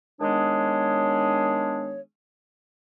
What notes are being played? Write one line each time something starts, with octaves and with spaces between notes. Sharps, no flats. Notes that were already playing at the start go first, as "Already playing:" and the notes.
D#3 G#3 B3 D4 G#4 C#5